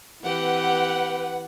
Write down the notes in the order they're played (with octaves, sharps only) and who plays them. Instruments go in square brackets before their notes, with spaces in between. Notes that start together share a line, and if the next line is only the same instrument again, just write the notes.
[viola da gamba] E3 C4 G4 [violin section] B4 F#5